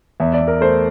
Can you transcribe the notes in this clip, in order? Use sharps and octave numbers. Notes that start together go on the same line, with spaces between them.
E2 E5
D5
E2
A#4
A3 C5